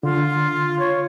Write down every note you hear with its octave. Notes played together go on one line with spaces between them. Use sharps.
D3 F4
C#5